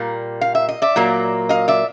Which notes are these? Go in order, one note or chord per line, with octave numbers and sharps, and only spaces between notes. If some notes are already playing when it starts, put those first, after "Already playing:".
Already playing: A#2 G3 A#3
F5
E5
D#5
D5 E5
A#2 F#3 A#3
D#5 F5
D5 E5